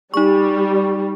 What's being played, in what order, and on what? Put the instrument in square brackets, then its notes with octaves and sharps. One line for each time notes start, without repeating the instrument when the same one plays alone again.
[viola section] G3 [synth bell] D#4 C#6